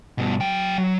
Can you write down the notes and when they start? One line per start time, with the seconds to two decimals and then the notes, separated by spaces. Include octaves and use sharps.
0.18 G2 B2
0.40 F#3 G5
0.78 F#3